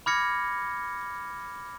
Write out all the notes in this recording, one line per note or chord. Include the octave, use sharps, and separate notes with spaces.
B5 D6 F6 G#6 A#6 C#7